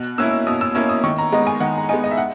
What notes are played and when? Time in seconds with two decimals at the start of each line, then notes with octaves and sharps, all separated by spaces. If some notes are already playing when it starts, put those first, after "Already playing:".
Already playing: B2 F#6
0.18 A#3 C#4 E4 E6
0.47 B2 D#6
0.61 E6
0.75 A#3 C#4 E4 E6
0.89 D#6
1.04 D#3 C#6
1.18 A#5
1.32 G#3 B3 D#4 A#5
1.47 G#5
1.60 D#3 F#5
1.78 A#5
1.89 G#3 B3 D#4 G#5
2.04 D#5
2.11 E5
2.17 F#5